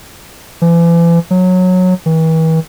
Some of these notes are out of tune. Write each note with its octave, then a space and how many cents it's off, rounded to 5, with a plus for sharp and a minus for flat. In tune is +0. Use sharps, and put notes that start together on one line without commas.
E3 +40
F#3 -15
E3 -40